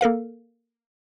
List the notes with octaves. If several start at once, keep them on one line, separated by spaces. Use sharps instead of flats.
A#3 A4 A#4 F5